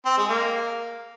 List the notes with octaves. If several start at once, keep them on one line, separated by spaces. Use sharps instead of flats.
C4
G#3
A#3